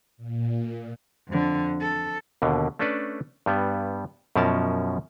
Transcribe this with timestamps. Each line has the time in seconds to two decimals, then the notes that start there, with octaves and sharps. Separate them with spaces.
0.17 A#2
1.28 F2 D3
1.81 A4
2.42 D#2 B2 D3
2.79 A3 C#4 D4 A4 B4 D5
3.46 G2 G3 B3
4.36 F#2 B2 F3 C#4 A#4 A5